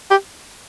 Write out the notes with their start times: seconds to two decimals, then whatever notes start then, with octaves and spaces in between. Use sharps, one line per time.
0.11 G4